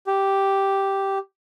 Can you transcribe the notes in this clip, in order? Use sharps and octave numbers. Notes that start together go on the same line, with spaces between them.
G4